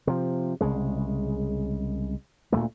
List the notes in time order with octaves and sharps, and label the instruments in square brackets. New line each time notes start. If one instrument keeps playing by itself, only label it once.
[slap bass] C3 F3
C2 C#3 G#3
D2 A#2 F#3 A3